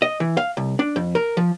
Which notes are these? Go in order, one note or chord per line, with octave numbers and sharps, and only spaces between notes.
D#5
E3
F5
C2
D4
F2
A#4
F3